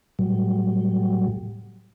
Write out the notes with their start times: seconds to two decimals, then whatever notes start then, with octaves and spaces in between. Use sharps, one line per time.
0.19 A2 F#3 G3